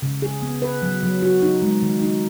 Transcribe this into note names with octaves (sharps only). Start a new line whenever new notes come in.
C#3
G#4
B3
B4
F#3
F#3
F#4
D#4
G#3
D#3
D#4